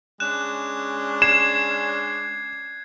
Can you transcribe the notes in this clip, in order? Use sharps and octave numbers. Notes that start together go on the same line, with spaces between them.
G#3 C#4 D4 F#6 E7
G#6 C7 E7